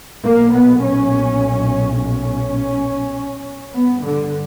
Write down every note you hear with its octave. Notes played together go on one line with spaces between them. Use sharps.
B1 A#2 A#3
B3
C#4
C#4
G1 G2 B3
D3